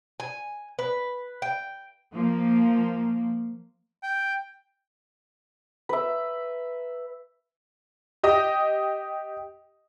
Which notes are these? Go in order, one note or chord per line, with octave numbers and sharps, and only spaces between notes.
G#5
B4
G5
F3 A#3
G5
B4 E5
G4 D#5